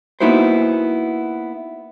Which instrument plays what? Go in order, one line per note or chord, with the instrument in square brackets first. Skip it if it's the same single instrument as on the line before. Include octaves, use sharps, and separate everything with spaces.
[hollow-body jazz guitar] A#3 B3 D#4 E4 F#4 C5